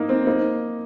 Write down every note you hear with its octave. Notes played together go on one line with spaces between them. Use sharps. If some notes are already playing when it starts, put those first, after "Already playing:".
Already playing: A#3 D#4
C4
A#3 D#4